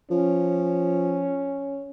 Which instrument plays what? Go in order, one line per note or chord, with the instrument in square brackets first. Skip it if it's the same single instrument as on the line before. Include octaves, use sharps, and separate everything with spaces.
[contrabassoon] F3 [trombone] C#4